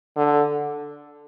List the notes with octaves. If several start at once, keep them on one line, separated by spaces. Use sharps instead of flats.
D3